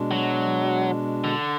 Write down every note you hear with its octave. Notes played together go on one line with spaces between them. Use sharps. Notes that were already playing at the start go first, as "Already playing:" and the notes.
Already playing: B2 G#3 D4
F#3
D3